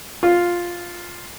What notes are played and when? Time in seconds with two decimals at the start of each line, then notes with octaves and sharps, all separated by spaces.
0.23 F4